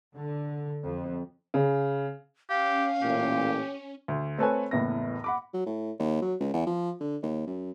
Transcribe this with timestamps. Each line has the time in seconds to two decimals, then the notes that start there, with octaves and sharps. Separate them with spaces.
0.12 D3
0.83 F2
1.54 C#3
2.49 C#4 G4 F5
3.02 A1 A#2 G4
4.08 D2
4.38 A3 C4 A4 B4 C#5 G#5
4.71 F#1 E2 A2 B3 A#6
5.24 F#5 B5 D6
5.54 F#3
5.66 A2
5.99 D#2
6.22 F#3
6.40 C#2
6.54 E2
6.67 F3
7.01 D3
7.22 D#2
7.47 F#2